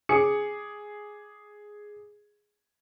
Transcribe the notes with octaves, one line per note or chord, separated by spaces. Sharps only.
G#4 D6 C#7